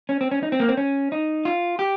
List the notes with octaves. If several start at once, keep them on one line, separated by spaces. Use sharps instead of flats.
C#4
C4
C#4
D#4
C4
A#3
C4
C#4
D#4
F4
G4